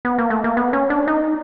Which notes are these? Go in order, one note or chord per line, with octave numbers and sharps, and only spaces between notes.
B3
A#3
A3
A#3
B3
C#4
D4
D#4